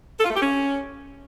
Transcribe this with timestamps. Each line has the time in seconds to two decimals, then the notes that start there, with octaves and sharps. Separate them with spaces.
0.19 A4
0.24 F4
0.30 A3
0.35 G4
0.40 C#4